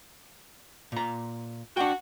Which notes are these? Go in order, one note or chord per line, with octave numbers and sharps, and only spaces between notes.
A#2 A#5
D4 F#4 G5